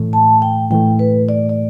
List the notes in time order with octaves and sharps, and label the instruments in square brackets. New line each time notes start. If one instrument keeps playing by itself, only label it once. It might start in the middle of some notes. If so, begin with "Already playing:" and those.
Already playing: [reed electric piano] A2 E3 A3
[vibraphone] A5
G5
[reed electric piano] A2 E3 A3 [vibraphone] G5
[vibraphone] B4
D5
D5